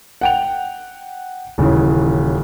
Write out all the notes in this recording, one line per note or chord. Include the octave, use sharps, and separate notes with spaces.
F#5 G5 F7
D#1 C#3 E3